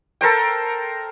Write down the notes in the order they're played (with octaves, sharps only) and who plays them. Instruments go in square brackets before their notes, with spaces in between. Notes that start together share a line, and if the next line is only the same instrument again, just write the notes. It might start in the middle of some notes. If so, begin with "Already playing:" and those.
[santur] A4 A#4 C5 G5